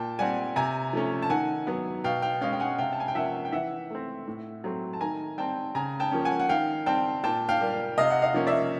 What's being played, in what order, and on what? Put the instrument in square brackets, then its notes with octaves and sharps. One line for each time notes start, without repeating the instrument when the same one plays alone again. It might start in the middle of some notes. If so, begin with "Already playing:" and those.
Already playing: [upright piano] A#2 G5 A5
G3 C4 F#5 G#5
C3 G#5 A#5
F3 A3 C#4
A5
D#3 F#5 G#5
F#3 B3
B2 F5 G5
F5 G5
G#3 C#4 F5 G5
G5
F#5 G#5
C3 F5 G5
A5
G#5
G5
F3 A#3 C#4 E5 F#5
G5
E3 E5 F#5
A3 C4
A2
F#3 A3 C4
A5
D#3 G#5 A#5
G3 C4 G5 A5
C#3 G#5 A#5
G5 A5
F3 A#3 C#4
F#5 G#5
F#5
D#3 F5 G5
G3 C4 G5 A5
A#2 G5 A5
F5 G5
G3 A#3
C3 D#5 F5
F#5
D#5 F5
F3 A#3 C#4
D5 E5